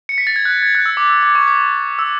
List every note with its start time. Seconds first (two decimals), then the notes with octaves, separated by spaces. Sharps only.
0.09 C#7
0.18 B6
0.27 A6
0.36 G#6
0.45 F#6
0.63 G#6
0.75 F#6
0.86 E6
0.97 D6
1.10 E6
1.23 D6
1.35 C#6
1.48 D6
1.99 E6